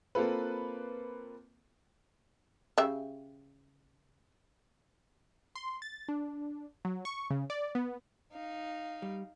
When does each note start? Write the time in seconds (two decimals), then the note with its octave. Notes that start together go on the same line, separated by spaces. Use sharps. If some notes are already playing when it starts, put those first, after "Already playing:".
0.15 A#3 C4 F4 A4 B4
2.78 C#3 G4 E5
5.56 C6
5.82 A6
6.09 D4
6.85 F#3
7.05 C#6
7.30 C#3
7.50 D5
7.75 B3
8.33 D#4 F5
9.02 G3